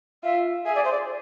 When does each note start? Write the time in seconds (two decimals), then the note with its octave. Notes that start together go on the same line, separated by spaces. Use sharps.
0.23 F4 E5
0.65 G#4 E5
0.75 D5
0.84 C5
0.92 D5